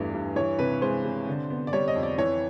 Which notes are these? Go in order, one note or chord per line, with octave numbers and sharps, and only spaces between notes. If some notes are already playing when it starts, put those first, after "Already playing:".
Already playing: E2 G2 E3 A3
G2
E3 C#5
C3 B4
G#3 C5
C3
D3
B3
D5
G3 C#5
D#5
F2
D5
E3 C#5